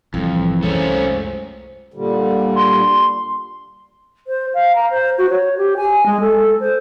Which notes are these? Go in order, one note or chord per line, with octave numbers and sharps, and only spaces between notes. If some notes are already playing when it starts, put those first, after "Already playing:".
C2 F2 A2 E3
C2 F#2 F3 G#3 A3 C#4 D#4
A#2 D3 G3
C6
C5
F5
A#5
C5
F#4
C#5
G4
G#5
G#3
A4
C5